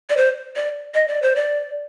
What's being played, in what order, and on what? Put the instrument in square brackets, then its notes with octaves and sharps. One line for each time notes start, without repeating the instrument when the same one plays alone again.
[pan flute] D5
C5
D5
D#5
D5
C5
D5